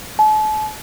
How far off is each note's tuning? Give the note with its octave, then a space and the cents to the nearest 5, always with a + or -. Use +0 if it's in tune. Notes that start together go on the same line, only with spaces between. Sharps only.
A5 -40